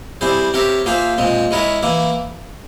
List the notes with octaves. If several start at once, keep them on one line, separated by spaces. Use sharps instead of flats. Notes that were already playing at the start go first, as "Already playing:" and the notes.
G3 C4 E4 G#4 C5
C4 G4 A#4 C#5 E5
A#3 F4 G#4 C5 E5
A#2 G#3 C4
G#3 E4 A#4 C#5 E5
E3 A#3 E4